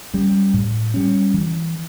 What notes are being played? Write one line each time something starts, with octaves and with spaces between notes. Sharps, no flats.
G3 C#4
A2
G3 C#4
E3